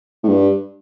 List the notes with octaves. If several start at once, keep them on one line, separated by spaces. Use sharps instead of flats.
A2
G2